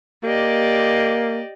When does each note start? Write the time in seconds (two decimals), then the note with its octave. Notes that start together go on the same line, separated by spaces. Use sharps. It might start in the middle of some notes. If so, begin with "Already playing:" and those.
0.23 A#3 G4 D5 D#5